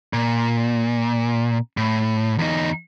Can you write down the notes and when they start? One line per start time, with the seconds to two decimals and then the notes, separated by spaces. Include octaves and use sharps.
0.13 A#2
1.77 A2
2.38 E2 D#4